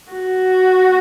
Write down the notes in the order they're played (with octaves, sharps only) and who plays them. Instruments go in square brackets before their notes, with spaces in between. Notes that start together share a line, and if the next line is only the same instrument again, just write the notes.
[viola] F#4